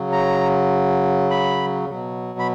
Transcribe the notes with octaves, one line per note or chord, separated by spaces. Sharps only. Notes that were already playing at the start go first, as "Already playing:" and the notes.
Already playing: C#3 F#3
A#5
B5
B2 F#3
B5